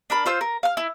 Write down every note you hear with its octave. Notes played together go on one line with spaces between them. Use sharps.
D4 A#4 B5
F4 C5 E6 G6
A#4
F5 F6
E4